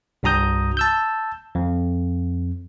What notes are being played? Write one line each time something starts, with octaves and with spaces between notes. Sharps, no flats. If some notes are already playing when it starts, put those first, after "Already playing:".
C2 G2 F#4 A#5 D#6 G6
A5 E6 G6
F2